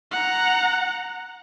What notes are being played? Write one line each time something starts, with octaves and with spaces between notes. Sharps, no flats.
F#5 A#5